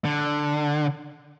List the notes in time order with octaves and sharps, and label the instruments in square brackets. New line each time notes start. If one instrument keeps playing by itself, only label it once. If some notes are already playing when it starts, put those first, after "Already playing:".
[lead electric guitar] D3